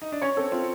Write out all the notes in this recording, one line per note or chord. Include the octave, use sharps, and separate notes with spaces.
D#4
D4
C#4 C#5
C4 A4
C4 F4